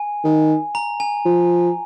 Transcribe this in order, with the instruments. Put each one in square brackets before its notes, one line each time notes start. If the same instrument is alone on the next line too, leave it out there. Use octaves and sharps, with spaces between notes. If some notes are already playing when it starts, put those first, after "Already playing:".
Already playing: [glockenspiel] G#5
[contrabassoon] D#3
[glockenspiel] A#5
G#5
[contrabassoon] F3